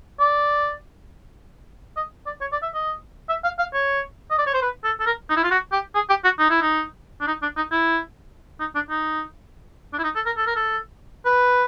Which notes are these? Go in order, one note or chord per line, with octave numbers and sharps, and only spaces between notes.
D5
D#5
D5
C#5
D5
E5
D#5
E5
F5
F5
C#5
D#5
D5
C#5
C5
B4
A4
A4
A#4
D#4
E4
F4
F#4
G4
G#4
G4
F#4
D#4
E4
D#4
D4
D#4
D4
D#4
E4
D#4
D4
D#4
D4
E4
D#4
A4
A#4
A4
A#4
A4
B4